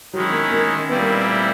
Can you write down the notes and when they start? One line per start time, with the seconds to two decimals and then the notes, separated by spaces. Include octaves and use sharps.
0.13 D#3 F#3 G#3 C#4 E4
0.32 A#3
0.52 A#3
0.89 A#2 G3 B3 C4 E4
1.02 A#3
1.27 A3